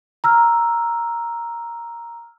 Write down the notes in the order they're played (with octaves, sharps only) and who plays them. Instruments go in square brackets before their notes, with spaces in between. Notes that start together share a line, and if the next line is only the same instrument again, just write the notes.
[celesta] A#5 E6 F6